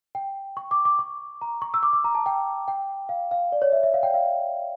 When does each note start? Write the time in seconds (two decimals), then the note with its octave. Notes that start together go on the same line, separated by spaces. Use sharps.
0.15 G5
0.57 C#6
0.71 D6
0.85 D6
0.99 C#6
1.41 A#5
1.62 C#6
1.74 E6
1.83 D6
1.93 D6
2.04 A#5
2.15 A5
2.26 G5
2.68 G5
3.09 F5
3.31 F5
3.52 D5
3.62 C#5
3.72 E5
3.83 E5
3.94 F5
4.03 G5
4.14 F5